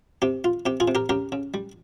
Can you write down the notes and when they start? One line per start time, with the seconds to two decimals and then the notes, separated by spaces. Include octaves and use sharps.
0.22 C3 G4
0.44 F4
0.66 C3 G4
0.80 F4 G#4
0.88 C3
0.95 G4 A#4
1.09 C#3 G4 A#4
1.32 C#3
1.54 G3